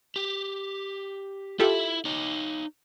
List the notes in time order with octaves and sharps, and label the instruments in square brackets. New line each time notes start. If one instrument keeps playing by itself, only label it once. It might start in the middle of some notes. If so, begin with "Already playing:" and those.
[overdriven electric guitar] G4
[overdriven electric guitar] E4 E5 [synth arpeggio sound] F4 G4 A4
[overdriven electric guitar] D#4 C#5